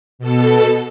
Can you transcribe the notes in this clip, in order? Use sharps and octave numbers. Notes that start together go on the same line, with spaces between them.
B2 A4